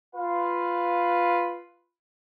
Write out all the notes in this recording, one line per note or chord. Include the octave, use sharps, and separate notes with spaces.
F4 B4 F5